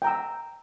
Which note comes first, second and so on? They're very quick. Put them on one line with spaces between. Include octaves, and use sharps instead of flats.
G5 A#5 E6